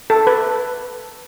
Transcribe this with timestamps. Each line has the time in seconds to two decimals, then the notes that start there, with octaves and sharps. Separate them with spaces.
0.10 A4
0.27 B4